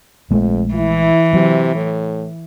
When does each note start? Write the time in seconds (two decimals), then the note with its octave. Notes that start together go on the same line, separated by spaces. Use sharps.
0.31 A#1 F2 G#3 A3
0.74 E3 E4
1.33 C3 F#3
1.75 A2